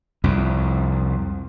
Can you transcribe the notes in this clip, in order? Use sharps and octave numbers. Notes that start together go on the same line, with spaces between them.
C2 F2